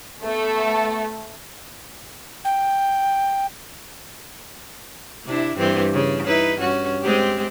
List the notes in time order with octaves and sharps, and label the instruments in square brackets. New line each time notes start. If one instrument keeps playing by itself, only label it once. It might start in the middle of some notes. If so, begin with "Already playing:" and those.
[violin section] A3 [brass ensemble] B3 A4
[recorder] G5
[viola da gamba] C3 D4 E4
G2 E3 C4
C#3
D#4 E4 B4
G2 C#4 F#4
G#3 C4 G4